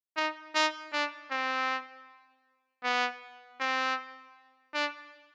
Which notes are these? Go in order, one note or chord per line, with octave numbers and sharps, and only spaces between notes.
D#4
D#4
D4
C4
B3
C4
D4